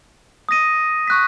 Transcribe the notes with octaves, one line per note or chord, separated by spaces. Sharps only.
D#6 A#6 D#7
C#6 F#6 B6